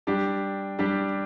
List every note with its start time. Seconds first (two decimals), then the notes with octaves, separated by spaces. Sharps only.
0.07 G3 D4 G4
0.79 G3 D4 G4